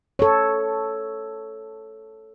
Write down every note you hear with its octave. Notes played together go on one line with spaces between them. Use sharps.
A4 C#5